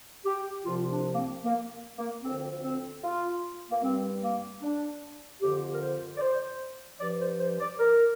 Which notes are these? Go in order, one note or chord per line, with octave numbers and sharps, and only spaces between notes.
G4
C2 C3 F3 F4
D4
A#3
C4
A#3
A#3
D2 D3 F3 C4
C4
F4
A#3
G2 G3 C4
A#3
D4
F2 D3 F3 G4
A#4
C5
D5
C5
G2 F3 D5
C5
C5
D5
A#4